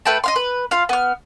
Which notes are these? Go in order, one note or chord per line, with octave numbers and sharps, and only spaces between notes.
A3 B4 G5 A5
D#5 F5 C6
B4
F4 F5
B3 F6